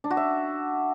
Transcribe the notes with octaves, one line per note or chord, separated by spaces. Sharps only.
D4
F#4
E5